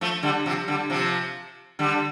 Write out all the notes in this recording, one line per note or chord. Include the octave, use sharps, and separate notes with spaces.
F3 A3
D3 G3
C3 F3
D3 G3
C3 F3
D3 G3